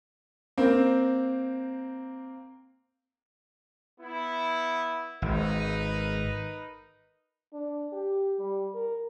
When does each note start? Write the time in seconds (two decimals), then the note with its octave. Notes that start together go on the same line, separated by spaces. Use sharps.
0.57 A#3 C4
4.01 B3 E4
5.22 G#1 D#4 A#4 B4
7.53 D4
7.92 G4
8.39 G3
8.74 A#4